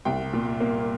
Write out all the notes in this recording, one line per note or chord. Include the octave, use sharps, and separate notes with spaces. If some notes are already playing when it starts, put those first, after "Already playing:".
C2 G5
A#2
A#3